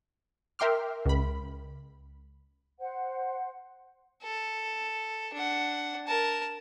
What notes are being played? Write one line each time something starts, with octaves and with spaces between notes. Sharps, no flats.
A#4 E5 G5 C6 D6 F6
C#2 B5
C5 F#5
A4
D4 F#5
A#4 A5